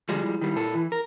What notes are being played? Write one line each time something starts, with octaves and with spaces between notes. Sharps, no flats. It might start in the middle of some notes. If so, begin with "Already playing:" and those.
D3 F3 G3 G#3
E4
D#3 G3
A#2 A4
E3
A#4